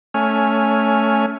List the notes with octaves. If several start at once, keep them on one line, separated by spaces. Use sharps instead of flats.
A3 C#4 G#5 F6